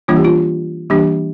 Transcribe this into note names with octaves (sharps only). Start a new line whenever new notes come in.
E3 G3 A#3 D4 F4
G4
F4
E3 G3 A#3 D4 G4